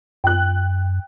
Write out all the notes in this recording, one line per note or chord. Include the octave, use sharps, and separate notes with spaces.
F#2 G5 F#6